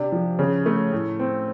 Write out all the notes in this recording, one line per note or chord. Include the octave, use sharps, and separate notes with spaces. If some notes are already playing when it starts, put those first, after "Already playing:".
Already playing: C3 D4
F3
C#3
A3
A2
C4